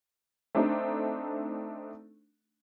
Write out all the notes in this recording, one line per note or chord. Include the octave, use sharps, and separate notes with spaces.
A3 C4 D4 D#4 A4